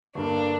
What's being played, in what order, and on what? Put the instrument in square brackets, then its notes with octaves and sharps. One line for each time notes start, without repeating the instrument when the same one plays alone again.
[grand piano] G1 G2 D3 A#3 [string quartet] D4